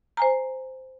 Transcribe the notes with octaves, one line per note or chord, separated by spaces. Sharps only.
C5 G#5 A#5